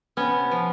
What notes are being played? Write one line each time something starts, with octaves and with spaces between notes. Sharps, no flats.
C3 B3 C#4
F3